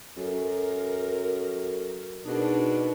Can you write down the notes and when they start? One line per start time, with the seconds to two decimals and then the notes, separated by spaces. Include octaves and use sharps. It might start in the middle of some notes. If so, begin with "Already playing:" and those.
0.17 F#2 A4 A#4
2.25 B2 D4 D#4 G#4 A#4